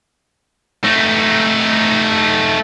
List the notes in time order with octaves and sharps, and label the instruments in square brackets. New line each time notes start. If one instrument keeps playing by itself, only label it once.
[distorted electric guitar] A3 D#4